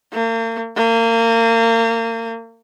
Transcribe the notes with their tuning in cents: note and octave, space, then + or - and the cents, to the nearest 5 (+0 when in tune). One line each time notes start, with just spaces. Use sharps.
A#3 -40
A#3 -30